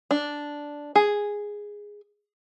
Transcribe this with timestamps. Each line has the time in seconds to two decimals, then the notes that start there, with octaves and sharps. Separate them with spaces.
0.11 D4
0.95 G#4